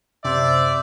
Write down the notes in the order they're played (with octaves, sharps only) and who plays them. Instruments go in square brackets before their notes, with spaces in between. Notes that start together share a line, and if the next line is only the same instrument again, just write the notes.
[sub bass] F#2 [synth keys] C3 [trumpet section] C5 D5 [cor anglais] E5